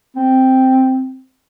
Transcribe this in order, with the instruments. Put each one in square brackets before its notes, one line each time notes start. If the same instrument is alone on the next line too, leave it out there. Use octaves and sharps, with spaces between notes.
[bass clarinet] C4